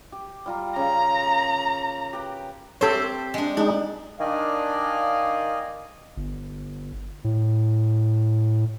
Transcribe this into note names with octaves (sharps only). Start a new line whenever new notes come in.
G4
G3 F4 A#5
C#3 A#5
A#3 G#4
G4 B4 G5
C4 G4 A4 C5 C#5
G#3 D4
G#3 D4 D#4
D#3 D4 D5 D#5 F5 G#5
G1
A2